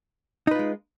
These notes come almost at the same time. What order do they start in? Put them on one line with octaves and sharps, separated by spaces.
D#4 B4 F4 G#3